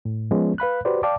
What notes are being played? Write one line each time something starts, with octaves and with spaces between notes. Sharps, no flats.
A2
F3 G#3 B3 C#4
B4 F5 B5 F#6
F#4 G4 B4 C5 D5
D5 F5 G5 A5 D6